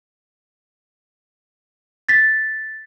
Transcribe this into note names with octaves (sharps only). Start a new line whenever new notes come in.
A6 B6